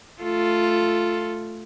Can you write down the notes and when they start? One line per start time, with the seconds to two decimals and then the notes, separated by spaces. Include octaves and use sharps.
0.22 A3 F4 A4